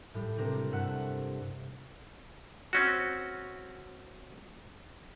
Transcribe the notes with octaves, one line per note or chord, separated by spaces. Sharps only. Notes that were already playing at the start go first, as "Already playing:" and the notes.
A2 G3
C3 C4 D4 A#4
G2 A3 E5 F#5 F#6
C4 C#4 F#4